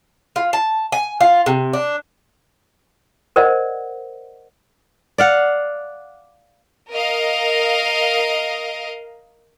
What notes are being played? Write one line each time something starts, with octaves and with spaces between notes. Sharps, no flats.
F4
A5
G#5
F4
C3
D4
A#4 C5 D5 D#5 F#5
D5 F5 F#5
A#4 D#5 F5